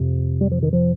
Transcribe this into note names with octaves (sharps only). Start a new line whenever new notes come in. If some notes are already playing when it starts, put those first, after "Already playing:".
Already playing: F2 C3
G3
F3
D#3
F3